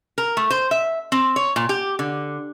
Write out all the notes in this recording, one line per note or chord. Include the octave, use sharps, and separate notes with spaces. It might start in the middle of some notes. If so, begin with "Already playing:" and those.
A#4
A3
C5
E5
C4
C#5
A#2
G4
D3